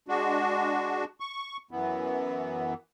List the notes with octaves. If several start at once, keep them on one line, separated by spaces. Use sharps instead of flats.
G#3 D4 F#4
C#6
F#2 E3 B3